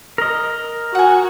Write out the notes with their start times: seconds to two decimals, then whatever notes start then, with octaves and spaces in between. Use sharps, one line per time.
0.18 A#4 D#5
0.95 F#4 F#5 G#5